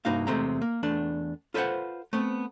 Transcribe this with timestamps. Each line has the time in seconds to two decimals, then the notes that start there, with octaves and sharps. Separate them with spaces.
0.05 C2 G2 A#3 D#4 F#4 F5
0.27 E2 C3 G#3 A3 C4 A#5
0.62 A#3
0.83 E2 A3 D4
1.54 F4 A4 B4 C5 E5 F#5
2.13 A3 B3 C4